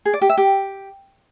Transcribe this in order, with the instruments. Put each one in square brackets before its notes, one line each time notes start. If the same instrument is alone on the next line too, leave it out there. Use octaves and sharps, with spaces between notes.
[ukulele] G#4
D5
G4
E5
G4